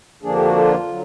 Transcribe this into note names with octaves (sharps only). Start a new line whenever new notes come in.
F2 D3 F3 A#3 D4 G#4
G4
F#4
F4
D3 F#3